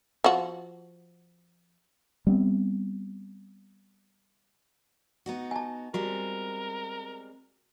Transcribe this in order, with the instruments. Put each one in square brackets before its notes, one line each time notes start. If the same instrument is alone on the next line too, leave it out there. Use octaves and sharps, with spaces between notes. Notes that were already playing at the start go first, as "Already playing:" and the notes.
[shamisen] F3 F#4
[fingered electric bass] G3 B3 C4
[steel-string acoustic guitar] B3 D#4 F#4
[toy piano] G#5 A5
[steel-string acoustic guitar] G3 G#3 C4 [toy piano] F#4 [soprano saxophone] A#4